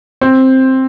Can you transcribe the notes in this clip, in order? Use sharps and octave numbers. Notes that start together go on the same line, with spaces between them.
C4